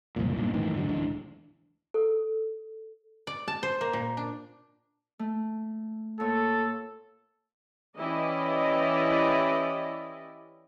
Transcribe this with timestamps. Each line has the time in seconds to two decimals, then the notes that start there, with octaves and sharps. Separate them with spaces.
0.16 F#1 C2 F2 A#2
0.37 B1 G2 A#2
0.53 F#2 A2 D#3 E3
0.76 G#2 D3 F#3
0.89 D1 C#2 E3 D4
1.94 A4
3.27 D5
3.48 A5
3.63 C5
3.81 A#3
3.93 A#2
4.17 D4
5.19 A3
6.20 A#2 A4 C#5
7.97 E3 C#4 E4 G4 D5 D#5